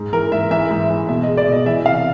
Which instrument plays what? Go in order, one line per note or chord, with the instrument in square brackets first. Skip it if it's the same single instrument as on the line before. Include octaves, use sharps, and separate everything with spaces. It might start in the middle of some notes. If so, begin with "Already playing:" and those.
Already playing: [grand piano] G#2
E3 A#4
G#2 E5
E3 E5
G#2
E3
B2 E5
D#5
G#3
D5
B2
D#5
E3 E5
C3 F5